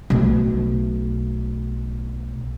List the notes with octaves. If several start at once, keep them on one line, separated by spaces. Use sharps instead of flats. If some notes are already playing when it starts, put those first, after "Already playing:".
B1 A3